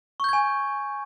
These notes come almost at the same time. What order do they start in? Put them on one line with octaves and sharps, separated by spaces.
C#6 G6 G#6 G#5